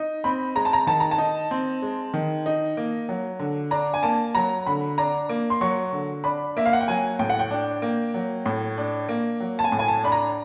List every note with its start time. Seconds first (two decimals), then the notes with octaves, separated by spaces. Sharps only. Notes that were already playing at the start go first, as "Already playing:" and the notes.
Already playing: D#4
0.24 C4 B5
0.55 G#3 A#5
0.65 A5
0.73 A#5
0.87 D#3 A5
1.00 A#5
1.11 A5
1.18 D#4
1.51 C4
1.82 G#3
2.14 D#3
2.46 D#4
2.77 A#3
3.09 F#3
3.39 D3
3.71 D4 A#5
3.94 G#5
4.03 A#3 A5
4.35 F#3 A#5
4.66 D3 B5
4.98 D4 A#5
5.29 A#3
5.50 C6
5.61 F#3 C#6
5.93 D3
6.24 D4 B5
6.57 A#3 E5
6.66 F5
6.73 F#5
6.81 G5
6.88 F#3 G#5
7.19 A2 G5
7.30 F#5
7.39 G5
7.51 D4
7.82 A#3
8.14 F#3
8.46 A2
8.78 D4
9.09 A#3
9.40 F#3
9.59 A5
9.64 G#5
9.72 A2
9.79 G#5
9.88 A5
10.04 D4 B5
10.12 A#5